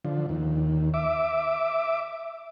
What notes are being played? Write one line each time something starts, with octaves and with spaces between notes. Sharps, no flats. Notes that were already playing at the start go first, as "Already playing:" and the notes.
D3 F3
D#2
E5 D6